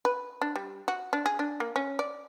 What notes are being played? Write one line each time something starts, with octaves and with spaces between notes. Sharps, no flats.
B4
D4
G3
F#4
D4
G#4
D4
A#3
C#4
D5